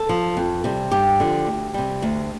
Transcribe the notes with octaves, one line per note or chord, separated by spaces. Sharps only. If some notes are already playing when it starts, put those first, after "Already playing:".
Already playing: A4
F3
F2
C3 G3
G2 G4
D3 F3
D2
C3 G3
D2